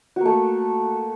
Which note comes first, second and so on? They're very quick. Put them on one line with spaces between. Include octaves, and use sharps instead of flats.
F#4 A#3 A3